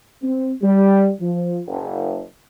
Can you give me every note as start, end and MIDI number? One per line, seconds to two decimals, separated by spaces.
0.23 0.52 60
0.62 1.10 55
1.20 1.59 53
1.67 2.21 30